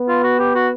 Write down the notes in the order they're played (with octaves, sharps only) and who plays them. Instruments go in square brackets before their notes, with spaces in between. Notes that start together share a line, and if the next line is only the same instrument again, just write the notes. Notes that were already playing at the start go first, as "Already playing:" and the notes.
Already playing: [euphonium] B3
[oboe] F4
F#4
G4
F#4